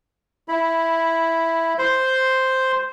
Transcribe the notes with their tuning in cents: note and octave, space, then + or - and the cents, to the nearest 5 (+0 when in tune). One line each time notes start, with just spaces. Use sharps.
E4 +0 B5 -10
C5 +0 C6 +0